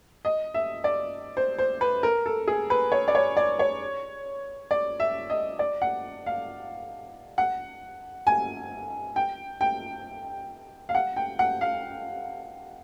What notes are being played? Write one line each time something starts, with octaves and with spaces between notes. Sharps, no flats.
D#5
E5
D5
C5
C5
B4
A#4
A4
G#4
B4
C#5
D5
C#5
D5
C#5
D5
E5
D#5
D5
F#5
F5
F#5
G#5
G5
G5
F5
F#5
G5
F#5
F5